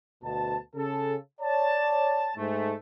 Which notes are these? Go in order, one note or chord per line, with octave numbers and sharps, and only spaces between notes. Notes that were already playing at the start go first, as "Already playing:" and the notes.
D2 B2 A5
C#3 A4
C#5 D5 A5
G#2 A3